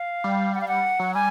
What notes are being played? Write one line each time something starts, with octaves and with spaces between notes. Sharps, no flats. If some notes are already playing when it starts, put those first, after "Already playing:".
Already playing: F5
G3
F#5
F5
F#5
F#3
G3 G#5